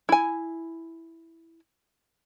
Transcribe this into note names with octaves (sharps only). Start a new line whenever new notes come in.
E4 G#5